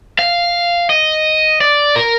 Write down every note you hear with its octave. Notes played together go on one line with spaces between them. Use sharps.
F5
D#5
D5
A#4